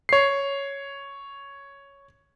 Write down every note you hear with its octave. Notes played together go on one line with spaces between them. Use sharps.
C#5 C7